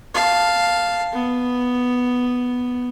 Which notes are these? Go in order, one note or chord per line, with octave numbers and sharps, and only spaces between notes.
F5 A5
B3